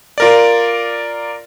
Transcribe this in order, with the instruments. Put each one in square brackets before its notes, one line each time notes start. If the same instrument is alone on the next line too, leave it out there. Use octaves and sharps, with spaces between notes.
[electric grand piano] F4 A#4 D5